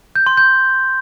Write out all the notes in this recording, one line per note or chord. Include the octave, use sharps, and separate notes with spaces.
G6
C6
G6